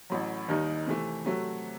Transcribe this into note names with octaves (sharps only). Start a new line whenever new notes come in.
A1 A2 F#3
D#2 D#3 G3 D#4
C3 E3 A3
C3 F#3 A3 C4 F#4